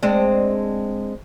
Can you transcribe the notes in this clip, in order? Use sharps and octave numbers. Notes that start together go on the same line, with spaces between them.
G#3 C4 D4